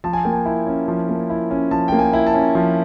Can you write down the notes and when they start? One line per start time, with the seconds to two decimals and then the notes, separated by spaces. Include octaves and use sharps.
0.04 F3 A5
0.13 G#5
0.23 A#3 G5
0.33 G#5
0.45 E4
0.67 C#4
0.88 F3
1.09 A#3
1.30 E4
1.51 C#4
1.71 F3 A5
1.88 A#3 G5
1.99 G#5
2.13 E4
2.26 A5
2.34 C#4
2.55 F3